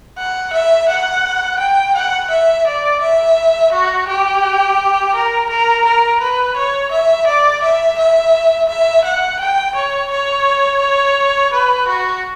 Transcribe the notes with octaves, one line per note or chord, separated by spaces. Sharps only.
F#5
E5
F#5
G5
F#5
E5
D5
E5
F#4
G4
A#4
A#4
A#4
B4
C#5
E5
D5
E5
E5
E5
F#5
G5
C#5
C#5
B4
F#4